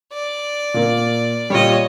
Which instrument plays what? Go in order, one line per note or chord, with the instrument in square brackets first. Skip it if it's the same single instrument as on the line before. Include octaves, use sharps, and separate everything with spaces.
[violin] D5
[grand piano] A#2 A#3
[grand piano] A#2 G3 [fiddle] C#5 D#5